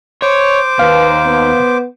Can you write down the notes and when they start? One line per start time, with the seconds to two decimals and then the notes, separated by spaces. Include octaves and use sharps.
0.22 C5 C#5 D6
0.79 D#2 B4 F5
1.26 B3